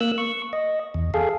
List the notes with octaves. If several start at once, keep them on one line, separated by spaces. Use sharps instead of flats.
A#3 E6 F#6
C#6
D#5
E2
G#4 A4 F5